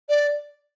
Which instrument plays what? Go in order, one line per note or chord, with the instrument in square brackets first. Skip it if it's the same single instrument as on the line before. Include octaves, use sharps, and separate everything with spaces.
[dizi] D5